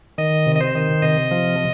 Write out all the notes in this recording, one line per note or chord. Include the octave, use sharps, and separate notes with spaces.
D#3 D#5
C3
D#5
C5
D#3
C3 D#5
F3